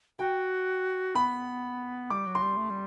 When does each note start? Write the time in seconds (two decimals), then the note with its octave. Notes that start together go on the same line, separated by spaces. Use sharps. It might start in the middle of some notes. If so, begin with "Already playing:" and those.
0.19 F#4 G5
1.15 B3 B5
2.10 G3 D6
2.26 F#3
2.35 C6
2.42 G3
2.57 A3
2.70 G3